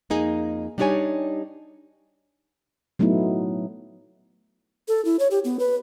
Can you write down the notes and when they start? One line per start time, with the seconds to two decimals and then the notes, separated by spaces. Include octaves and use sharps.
0.10 F2 A#3 D#4 G#4
0.78 G3 D4 D#4 G4 C#5 G#5
2.99 F#3 A3 B3 D#4 E4
4.88 A4
5.05 E4
5.19 C#5
5.31 G4
5.44 B3
5.59 B4